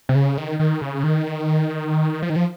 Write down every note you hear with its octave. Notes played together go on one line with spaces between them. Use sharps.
C3
C#3
D#3
D#3
C#3
D#3
F3
D#3
F3